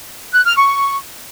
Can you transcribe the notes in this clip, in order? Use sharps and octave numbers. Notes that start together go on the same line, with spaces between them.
F#6
F6
C#6